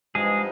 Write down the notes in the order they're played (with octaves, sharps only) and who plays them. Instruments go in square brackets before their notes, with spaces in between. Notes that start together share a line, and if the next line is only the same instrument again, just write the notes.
[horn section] G2 F3 B3 D#4 [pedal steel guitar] G#3 G#4